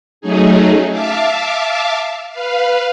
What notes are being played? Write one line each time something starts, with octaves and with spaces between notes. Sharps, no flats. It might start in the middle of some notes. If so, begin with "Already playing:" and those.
F#3 A3 C#4 D#4 G#4
E5 F5 A5 D6
B4 F5